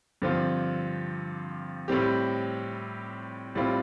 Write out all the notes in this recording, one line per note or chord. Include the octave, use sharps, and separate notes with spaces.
G2 D3 F3 C4 F4
A2 G3 C4 G4
A2 G3 C4 F4